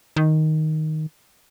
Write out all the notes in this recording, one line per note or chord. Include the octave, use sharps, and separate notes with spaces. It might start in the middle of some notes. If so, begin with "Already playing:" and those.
D#3